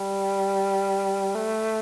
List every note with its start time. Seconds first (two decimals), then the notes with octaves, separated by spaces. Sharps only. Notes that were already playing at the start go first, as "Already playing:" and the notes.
Already playing: G3
1.35 A3